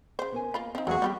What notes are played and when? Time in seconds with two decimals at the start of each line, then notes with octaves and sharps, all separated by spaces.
0.19 C#3 C5
0.32 B3 A#4 G#5
0.54 A#3 F4 D#5 B5
0.75 F3 C4 D#4
0.87 E2 F#3 G#3 A#3 F#4 G#4
1.02 G3 B3 F4 G4